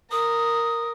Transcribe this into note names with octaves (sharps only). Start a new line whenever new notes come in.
A#4 D#6